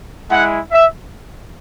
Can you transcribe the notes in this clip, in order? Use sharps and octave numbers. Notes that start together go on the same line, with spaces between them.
G#3 E4 F#5
E5